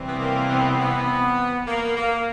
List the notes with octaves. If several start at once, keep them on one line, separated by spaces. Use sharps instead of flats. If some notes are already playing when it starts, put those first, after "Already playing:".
Already playing: C3 E3 G3 C4
B3
A#3
B3
B3
A#3
A#3